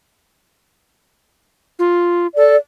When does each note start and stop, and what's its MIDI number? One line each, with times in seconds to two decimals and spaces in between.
1.79 2.27 65
2.36 2.56 69
2.36 2.56 74